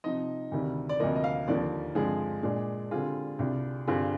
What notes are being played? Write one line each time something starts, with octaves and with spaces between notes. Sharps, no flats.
C3 F3 C4 D#4 D#5
D2 C3 D#3 G3
D5
D2 C3 F3 A#3 D#5
D#5
F5
D#2 D3 F3 A#3 D5
G2 D3 F3 G#3 C4 G#4
A#2 G#3 D4
D3 G3 C4 F4 G#4
C2 C3 G3 D4 F4
G2 D3 G3 C4 F4 G#4